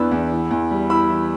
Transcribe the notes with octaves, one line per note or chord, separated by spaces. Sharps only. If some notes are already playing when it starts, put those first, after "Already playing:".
Already playing: E2 E3 B3 D4 B4 B5 E6
E2
E3
E2
G3
E4 B5 E6
E3